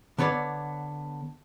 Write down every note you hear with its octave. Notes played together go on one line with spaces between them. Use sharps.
D3 B3 C#5 D5